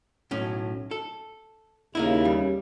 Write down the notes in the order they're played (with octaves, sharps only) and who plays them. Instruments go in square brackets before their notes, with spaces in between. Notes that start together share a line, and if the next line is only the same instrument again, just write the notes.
[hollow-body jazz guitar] B1 A2 C#4
A4
[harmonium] D#2 C#3 [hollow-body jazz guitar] A#3 D#4 E4
[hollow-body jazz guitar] G3